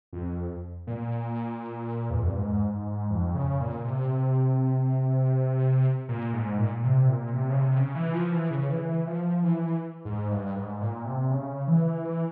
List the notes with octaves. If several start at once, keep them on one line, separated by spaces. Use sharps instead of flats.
F2
A#2
E2
F2
G2
G#2
G#2
F2
C#3
A#2
C3
A#2
G#2
A#2
C3
A#2
C3
C#3
C3
C#3
E3
F3
E3
C#3
E3
E3
F3
E3
G#2
G2
G#2
A#2
C3
C#3
E3
E3